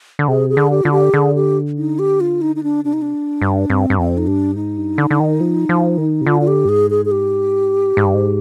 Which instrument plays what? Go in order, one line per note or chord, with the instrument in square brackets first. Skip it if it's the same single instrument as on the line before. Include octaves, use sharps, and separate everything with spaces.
[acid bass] D3
[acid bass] C3 [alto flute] G#4
[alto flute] G#4
[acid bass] D3
[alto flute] G4
[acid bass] D3 [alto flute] F4
[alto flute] G4
[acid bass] D3 [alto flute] G#4
[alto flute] G4
D#4
G4
F4
D#4
D#4
D4
[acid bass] C3 [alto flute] D4
[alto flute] D#4
D4
[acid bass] G2
[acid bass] G2 [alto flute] C4
[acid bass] G2
[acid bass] F2 [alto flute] C4
[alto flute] D#4
[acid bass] G2 [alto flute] D4
[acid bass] G#2 [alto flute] D#4
[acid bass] G2
D3
D3
D#3
F3
F3
D#3
C3
[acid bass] D3 [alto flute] F4
[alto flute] F4
G4
[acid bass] G2
[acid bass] G#2 [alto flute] G#4
[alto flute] G#4
G#4
G4
[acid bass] G#2
G2
G#2